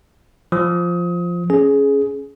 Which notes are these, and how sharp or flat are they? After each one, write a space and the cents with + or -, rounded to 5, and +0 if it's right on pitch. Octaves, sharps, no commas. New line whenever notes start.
F3 +0 D#6 +30
C#4 +0 G#4 +15